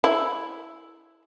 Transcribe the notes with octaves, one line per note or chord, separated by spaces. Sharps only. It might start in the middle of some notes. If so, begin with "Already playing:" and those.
E4